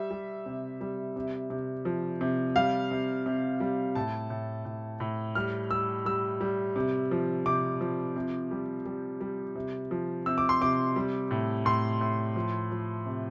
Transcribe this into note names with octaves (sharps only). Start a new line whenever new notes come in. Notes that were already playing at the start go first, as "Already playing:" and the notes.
Already playing: G3 E5
G3
C3
G3
C3
C3
F3
C3
G3 F5
C3
C3
G3
A2 A5
A2
A2
A2
G3 F6
G3 E6
G3 E6
G3
C3
F3
C3 D6
F3
C3
G3
G3
G3
C3
F3
C3 E6
D6
C6
C3 D6
G3
A2
A2 C6
A2
F3
F3
C3